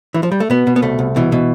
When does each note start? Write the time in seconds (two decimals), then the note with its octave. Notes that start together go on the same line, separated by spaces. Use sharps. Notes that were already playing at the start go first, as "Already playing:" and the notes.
0.14 E3
0.23 F3
0.32 G3
0.40 A3
0.50 B2 B3
0.67 B2
0.76 B3
0.82 C2 A3
0.99 C2
1.16 B2 E3
1.32 B2